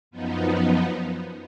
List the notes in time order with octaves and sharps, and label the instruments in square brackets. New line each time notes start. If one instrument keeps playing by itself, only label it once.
[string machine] F#2 F3 B3 D#4